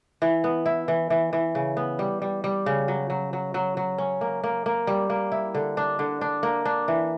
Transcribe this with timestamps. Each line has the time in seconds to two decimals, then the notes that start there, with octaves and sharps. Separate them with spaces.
0.22 E3
0.44 B3
0.66 E4
0.88 E3
1.10 E3
1.33 E3
1.55 C#3
1.77 B3
1.99 G3
2.22 G3
2.44 G3
2.66 C#3
2.88 F#3
3.10 F#3
3.33 F#3
3.54 F#3
3.77 F#3
3.98 C#4
4.21 A#3
4.44 A#3
4.66 A#3
4.87 G3
5.10 A#3
5.32 E4
5.55 D3
5.77 D4
5.99 D3
6.21 D4
6.43 A#3
6.65 D4
6.88 E3